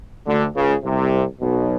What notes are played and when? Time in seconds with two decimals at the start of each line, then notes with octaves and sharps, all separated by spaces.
0.26 D2 D3
0.55 C#2 C#3
0.84 C2 C3
1.41 B1 B2